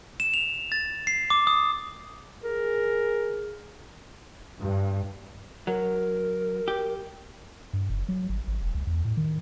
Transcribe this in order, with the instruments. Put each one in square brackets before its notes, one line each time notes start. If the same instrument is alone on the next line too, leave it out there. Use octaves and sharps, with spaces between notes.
[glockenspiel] E7
F7
A6
C7
D6
D#6
[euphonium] G#4 [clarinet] A#4
[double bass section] G2
[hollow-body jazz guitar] F#3 [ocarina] A#4
[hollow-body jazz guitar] G4
[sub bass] G2
F#1
F#3
G#1
G#1
E1
C#2
E2
A2
D#3